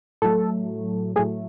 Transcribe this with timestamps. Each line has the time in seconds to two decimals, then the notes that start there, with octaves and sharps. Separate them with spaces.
0.22 A2 F#3 A3 A4
1.16 A2 F#3 A3 G#4